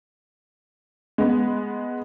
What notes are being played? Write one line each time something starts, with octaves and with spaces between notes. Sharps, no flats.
G#3 B3